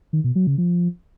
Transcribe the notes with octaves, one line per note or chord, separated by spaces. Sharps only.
D#3
B2
F#3
C#3
F3